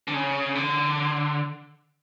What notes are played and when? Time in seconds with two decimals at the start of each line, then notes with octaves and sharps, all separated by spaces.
0.08 D3
0.14 C#3
0.55 D3